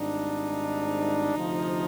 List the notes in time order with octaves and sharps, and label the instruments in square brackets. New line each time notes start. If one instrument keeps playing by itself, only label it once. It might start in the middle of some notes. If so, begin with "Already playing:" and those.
Already playing: [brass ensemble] G#1 G#2 G3 D4 [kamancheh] D#4
[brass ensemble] D2 C3 F3